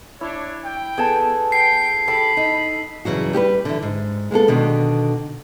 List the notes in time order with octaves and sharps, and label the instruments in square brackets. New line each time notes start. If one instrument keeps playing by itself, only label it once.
[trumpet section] D4 C#5 [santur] E4
[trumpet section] G5
[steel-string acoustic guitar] B3 [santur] G#4 A4 A5
[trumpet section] G5 [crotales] C7
[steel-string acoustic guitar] G4 [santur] A4 [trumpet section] B5
[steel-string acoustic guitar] D#4
[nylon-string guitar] G2 C#3 E3 F#3 F#4
G3 G4 G#4 B4
D3 E3
G#2
G#3 A#3 B3 A4
B2 D3 D#3